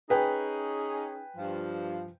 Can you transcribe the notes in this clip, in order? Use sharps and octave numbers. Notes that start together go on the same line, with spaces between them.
C#4 D#4 G#4 B4 G5 G#5
G2 F3